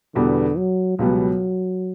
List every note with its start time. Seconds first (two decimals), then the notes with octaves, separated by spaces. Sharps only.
0.15 E2 B2 D3 G3 B3
0.57 F#3
0.98 C#2 B2 F#3 G3 B3